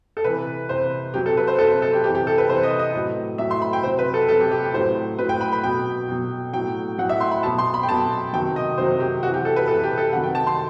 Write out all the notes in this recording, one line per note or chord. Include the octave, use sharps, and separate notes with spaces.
A4
C3 E3 B4
C3 E3 C5
C3 F#3 G4
A4
B4
C5
C3 F#3 A4
C5
A4
G4
C3 E3 G4
G4
A4
B4
C3 E3 C5
D#5
D#5
A2 F#3
A2 F#3 E5
C6
B5
G5
C3 F#3 C5
B4
A4
C3 F#3 A4
G4
G4
G4
A2 F#3 C5
F#3 B4
A2
G5
B5
B5
B2 F#3 G5
B2 F#3
A2 F#3 G5
A2 F#3 F#5
E5
C6
B5
B2 F#3 A5
C6
B5
G5
B2 F#3 A5
C3 D#3 F#3 G5
D#5
C3 D#3 F#3 C5
G4
C3 F#4
E3
G4
A4
B4
C3 E3 A4
G4
A4
C3 D#3 F#3 F#5
G5
A5
C6